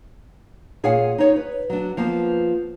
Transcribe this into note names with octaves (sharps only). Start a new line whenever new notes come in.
A#2 G#4 C#5 F5 F#5 G#5
D#4 C#5 D#5
B4
F#3 D4
F3 A#3 B3